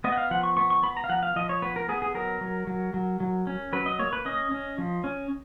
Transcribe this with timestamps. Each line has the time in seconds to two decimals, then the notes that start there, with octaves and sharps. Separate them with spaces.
0.04 B3 D#5
0.12 F#5
0.18 F5
0.31 F3 F#5
0.43 C#6
0.57 B3 C#6
0.70 C#6
0.83 B3 B5
0.97 A#5
1.04 F5
1.09 F3 F#5
1.23 F5
1.36 F3 D#5
1.49 C#5
1.62 B3 B4
1.76 A#4
1.89 B3 G#4
2.02 G#4
2.15 F#3 A#4
2.41 F#3
2.67 F#3
2.94 F#3
3.20 F#3
3.47 C#4
3.73 F#3 B4
3.86 D#5
3.99 A#3 C#5
4.13 B4
4.25 C#4 D#5
4.51 C#4
4.78 F3
5.04 C#4